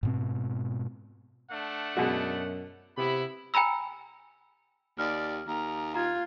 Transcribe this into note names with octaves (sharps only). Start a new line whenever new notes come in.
G#2 B2 C4
A3 D4 F#5
F#2 B2 G#3 F#4
C3 B3 E4 G4 B5
G5 G#5 A#5 B5 E6
D#2 D5 F6
D#2 A#5
F4 A#5 G#6